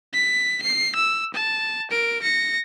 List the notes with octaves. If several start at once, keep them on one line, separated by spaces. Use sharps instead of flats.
B6
C7
E6
A5
A#4 D7
A#6 C#7